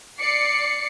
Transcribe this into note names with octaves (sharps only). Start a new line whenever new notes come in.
D5 C7 C#7